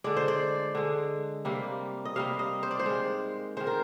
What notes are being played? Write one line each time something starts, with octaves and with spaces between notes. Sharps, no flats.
D3 G#3 D5
C5
D5
D3 G#3
C3 G3 A#3
D#5
C3 G3 A#3 F5
D#5
C5
D5
C5
D#3 G#3
D#3 G#3 C5
A#4